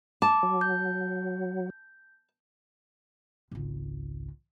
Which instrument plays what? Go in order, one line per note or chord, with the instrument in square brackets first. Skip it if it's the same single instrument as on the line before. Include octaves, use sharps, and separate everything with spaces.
[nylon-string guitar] A5 [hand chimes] D6
[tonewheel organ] F#3
[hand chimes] G6
[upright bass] G#1 C#2